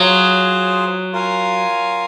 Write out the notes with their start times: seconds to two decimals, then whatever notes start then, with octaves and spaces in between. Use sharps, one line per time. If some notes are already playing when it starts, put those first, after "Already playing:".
Already playing: F#3 F4 G#4 C5
1.13 F4 A#4 F5 G#5